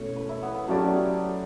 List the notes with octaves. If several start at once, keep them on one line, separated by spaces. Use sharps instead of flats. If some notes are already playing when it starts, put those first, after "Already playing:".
Already playing: B2 A3 C#4 E4 C#5
B4
E4
B3
B3
F#3 A3 C#4 G4 D5